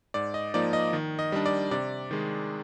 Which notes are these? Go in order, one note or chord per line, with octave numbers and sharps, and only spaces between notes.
G#2 D5
D#5
F3 A#3 D#4 D5
D#5
D#3
D#5
G3 D4
D5
C3 D5
D#3 G#3